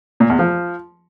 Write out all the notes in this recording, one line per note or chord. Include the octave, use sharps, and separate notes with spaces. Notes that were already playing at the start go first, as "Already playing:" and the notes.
A#2
E2
F3